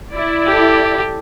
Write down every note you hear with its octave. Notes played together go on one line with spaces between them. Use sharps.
E4 D5
G4 A4